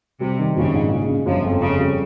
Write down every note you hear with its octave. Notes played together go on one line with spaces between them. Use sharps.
C3 G3
D#3
A#1 C#3
G#2
G#3
C#3
G1 F3
F2
F2 C#3
G3